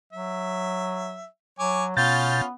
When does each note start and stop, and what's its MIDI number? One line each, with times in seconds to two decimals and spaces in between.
0.13 1.24 54
0.13 1.26 76
1.59 1.95 54
1.59 1.85 73
1.59 1.85 80
1.59 1.85 86
1.97 2.41 47
1.97 2.53 59
1.97 2.43 61
1.97 2.43 65
1.97 2.41 91
1.97 2.41 93